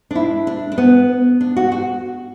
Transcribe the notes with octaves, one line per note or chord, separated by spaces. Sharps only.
D4
E4
D4
D4
B3
D4
F#4
F#4